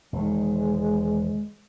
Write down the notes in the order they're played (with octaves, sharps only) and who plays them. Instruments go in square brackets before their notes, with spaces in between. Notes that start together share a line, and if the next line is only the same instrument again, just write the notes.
[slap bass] E1 D#3 [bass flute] G#3